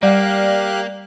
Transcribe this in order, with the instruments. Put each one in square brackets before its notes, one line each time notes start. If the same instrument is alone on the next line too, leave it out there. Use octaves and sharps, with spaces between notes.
[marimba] G3 [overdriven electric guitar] A#3 [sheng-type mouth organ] G4 F5 F#6 [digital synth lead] D5